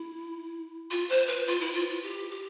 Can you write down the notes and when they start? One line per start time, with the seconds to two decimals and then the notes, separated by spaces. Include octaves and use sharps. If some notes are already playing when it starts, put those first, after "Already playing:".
Already playing: E4
0.91 F4
1.09 C5
1.28 B4
1.47 F4
1.61 E4
1.75 F4
1.89 F4
2.03 G4
2.31 G4